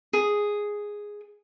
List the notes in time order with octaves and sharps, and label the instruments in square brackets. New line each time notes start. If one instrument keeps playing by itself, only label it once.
[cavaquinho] G#4